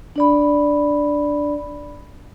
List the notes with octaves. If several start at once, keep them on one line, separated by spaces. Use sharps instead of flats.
D4 D5 B5